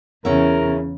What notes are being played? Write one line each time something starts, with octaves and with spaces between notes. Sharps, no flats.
E2 C#3 C#4 E4 G#4 A#4 E5